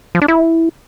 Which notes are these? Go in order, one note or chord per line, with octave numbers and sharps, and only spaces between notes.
F3
D4
E4